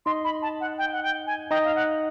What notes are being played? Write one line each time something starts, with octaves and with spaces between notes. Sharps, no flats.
D#4 D#5 C6
B5
A5
F#5
G5
F#5
G5
G#5
D#4 D#5 G5
F5
F#5